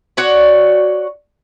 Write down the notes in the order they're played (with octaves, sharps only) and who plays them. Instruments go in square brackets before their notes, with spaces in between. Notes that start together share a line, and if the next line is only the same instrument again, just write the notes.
[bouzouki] F#4 C#5 D5